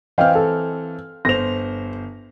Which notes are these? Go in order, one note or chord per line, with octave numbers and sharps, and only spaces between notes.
E3 C4 D#5 F5 G5 F6
A4
G1 C5 A#6 F7